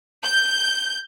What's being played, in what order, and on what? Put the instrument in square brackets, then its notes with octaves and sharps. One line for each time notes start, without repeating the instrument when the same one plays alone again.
[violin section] G6